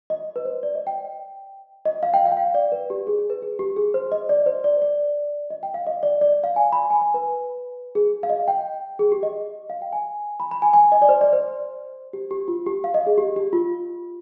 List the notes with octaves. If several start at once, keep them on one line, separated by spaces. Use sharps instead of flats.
D#5
B4
C5
D5
D#5
G5
D#5
F5
G5
F5
G5
F5
D5
B4
G4
G#4
G#4
B4
G#4
G4
G#4
C5
D#5
D5
C5
D5
D5
D#5
G5
F5
D#5
D5
D5
F5
G#5
B5
G#5
G#5
B4
G#4
F5
D#5
G5
G#4
G4
D#5
F5
G5
G#5
B5
B5
G#5
G#5
D#5
D5
C5
D5
C5
G4
G4
F4
G4
F5
D#5
G#4
G4
G4
F4